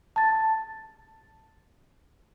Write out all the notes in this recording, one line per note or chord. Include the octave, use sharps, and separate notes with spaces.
A5 A6